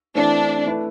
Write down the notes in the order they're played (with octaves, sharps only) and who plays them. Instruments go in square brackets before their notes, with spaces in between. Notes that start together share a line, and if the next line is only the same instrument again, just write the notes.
[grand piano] E3 A3 C4 [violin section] D4
[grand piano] A3 E4 B4